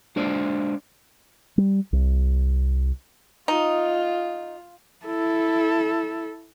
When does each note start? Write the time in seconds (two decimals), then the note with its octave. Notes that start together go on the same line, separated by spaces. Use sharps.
0.16 G#3 D4 C5 D5
1.58 G3
1.93 C2
3.48 D#4 F4
5.06 E4 A4